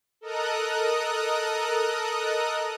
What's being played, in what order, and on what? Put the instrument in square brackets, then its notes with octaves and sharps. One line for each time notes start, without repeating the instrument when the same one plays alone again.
[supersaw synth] A4 A#4 D#5 A#5 D#6 F#6